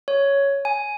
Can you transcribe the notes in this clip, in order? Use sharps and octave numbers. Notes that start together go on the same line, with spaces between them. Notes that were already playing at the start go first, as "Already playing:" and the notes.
C#5
G#5